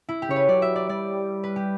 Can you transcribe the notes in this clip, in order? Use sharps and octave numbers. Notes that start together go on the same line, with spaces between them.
E4
G4
C#3 C#5
B4
F#3 D5
E5
D5
G3 D5
B4
G4